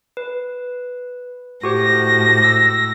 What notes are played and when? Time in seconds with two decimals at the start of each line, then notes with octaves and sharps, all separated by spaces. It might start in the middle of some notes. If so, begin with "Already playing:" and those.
0.17 B4
1.63 A2 F#4 G4 C5 A#6
2.44 E6